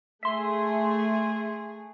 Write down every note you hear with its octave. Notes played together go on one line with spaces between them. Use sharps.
A3 G#4 E5 C6